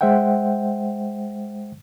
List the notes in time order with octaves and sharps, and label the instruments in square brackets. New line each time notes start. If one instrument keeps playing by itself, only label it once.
[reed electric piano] G#3 C5 E5 F#5 G5